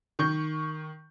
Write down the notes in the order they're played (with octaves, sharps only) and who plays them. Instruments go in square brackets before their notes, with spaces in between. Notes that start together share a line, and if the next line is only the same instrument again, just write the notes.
[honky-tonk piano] D#3 C#6 G6